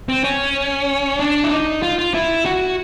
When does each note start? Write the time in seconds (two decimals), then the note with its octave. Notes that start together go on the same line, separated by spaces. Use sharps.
0.09 C4
0.24 C#4
1.19 D4
1.44 E4
1.51 D#4
1.83 F4
1.99 F4
2.14 E4
2.46 F#4